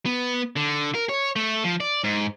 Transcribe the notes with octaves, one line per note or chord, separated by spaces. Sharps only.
B3
D3
A#4
C#5
A3
F3
D5
G#2